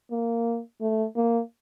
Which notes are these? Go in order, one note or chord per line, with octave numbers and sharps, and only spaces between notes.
A#3
A3
A#3